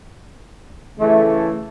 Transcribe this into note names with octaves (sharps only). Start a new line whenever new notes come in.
C#3 E3 A3